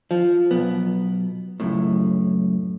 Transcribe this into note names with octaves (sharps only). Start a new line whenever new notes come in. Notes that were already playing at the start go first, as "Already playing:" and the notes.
F3
B1 B3
C#2 F#2 A2